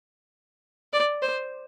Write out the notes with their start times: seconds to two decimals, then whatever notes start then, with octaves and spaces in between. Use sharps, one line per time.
0.93 D5
1.22 C5